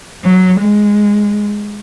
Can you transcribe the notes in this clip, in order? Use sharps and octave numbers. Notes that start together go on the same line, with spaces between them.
F#3
G#3